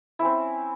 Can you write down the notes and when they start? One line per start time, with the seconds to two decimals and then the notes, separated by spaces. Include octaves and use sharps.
0.19 E4
0.22 C#4
0.25 C4